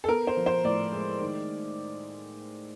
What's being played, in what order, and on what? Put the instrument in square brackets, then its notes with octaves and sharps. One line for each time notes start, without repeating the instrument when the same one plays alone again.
[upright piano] A4
B3 A#4
C5
F3
C5
A2 D5
G#3
D#3